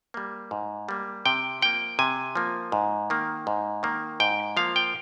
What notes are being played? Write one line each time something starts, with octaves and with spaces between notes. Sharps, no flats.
G3 A#3
G#2
G3 A#3
C3 G5
F3 A#3 G5
C3 G#5
F3 A#3
G#2
D#3 A#3
G#2
D#3 A#3
G#2 G5
F3 A#3 F5
G5